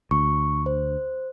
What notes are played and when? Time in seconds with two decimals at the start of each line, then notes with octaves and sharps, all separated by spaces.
0.11 D2 C#6
0.66 C5